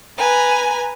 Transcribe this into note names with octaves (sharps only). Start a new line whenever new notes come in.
B4 G#5 A#5